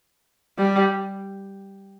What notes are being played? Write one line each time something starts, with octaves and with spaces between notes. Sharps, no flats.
G3